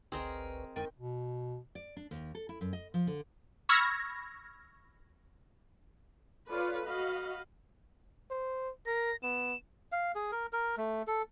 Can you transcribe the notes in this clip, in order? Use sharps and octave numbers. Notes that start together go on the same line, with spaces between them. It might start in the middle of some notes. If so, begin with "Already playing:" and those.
G1 C#2 C4 G#4 A#4 B4 D#5
F2 D3 D#3 G#3 G5
B2
D5
D4
D#2
A4
E4
F#2
D#5
F3
D3
B5 C#6 E6 F6 G#6 A#6
F4 A4 B4 C#5 D5 F5
F#4 D#5 F5 B5
C5
A#4 A#6
B3 E7
F5
G#4
A#4
A#4
A3
A4